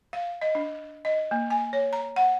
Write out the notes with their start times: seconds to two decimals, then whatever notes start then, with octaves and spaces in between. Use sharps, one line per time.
0.13 F5
0.41 D#5
0.55 D4
1.05 D#5
1.31 A#3
1.50 G#5
1.73 C#5
1.93 A#5
2.16 F#5